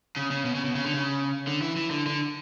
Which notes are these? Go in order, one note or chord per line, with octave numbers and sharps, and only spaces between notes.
C#3
C#3
B2
C#3
B2
C#3
D3
C#3
D3
E3
E3
D3
D3